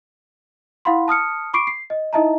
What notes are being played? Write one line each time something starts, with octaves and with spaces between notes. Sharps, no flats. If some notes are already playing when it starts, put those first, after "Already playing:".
E4 F5 F#5 B5 C6
A5 D#6 F6 C#7
B5 C#6 D6 C7 D7
C7
D#5
D#4 E4 D#5 E5 A5 A#5